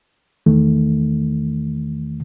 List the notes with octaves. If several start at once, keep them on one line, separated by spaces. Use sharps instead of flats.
E2 D#3 A3